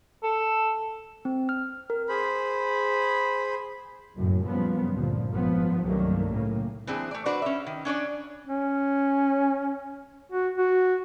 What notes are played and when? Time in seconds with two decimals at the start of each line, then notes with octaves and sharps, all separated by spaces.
0.23 A4
1.25 C4
1.49 F6
1.90 A#4
2.08 G#4 C5 B5
4.16 F#1 B1 F#2 A2
4.45 F#2 A#2 C#3 F3 G3 B3
4.92 D2 G2 A#2 D3 F3
5.31 G#1 F3 B3
5.83 C2 G2 D#3 F#3 A3 A#3
6.30 A2 C#3 A#3
6.87 E3 C4 D4 G#4
7.11 A3 D5
7.26 D4 F#4 B4 C5 D5
7.42 C#4 E5
7.66 D#3
7.85 C#4 D4 C#5 D5
8.47 C#4
10.32 F#4
10.58 F#4